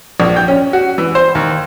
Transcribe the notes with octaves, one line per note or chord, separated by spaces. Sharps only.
A#1
G5
C#4
F#4
E3
C5
D#2